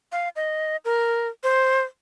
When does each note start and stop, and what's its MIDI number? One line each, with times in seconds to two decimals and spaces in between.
0.12 0.29 77
0.36 0.77 75
0.85 1.28 70
1.43 1.82 72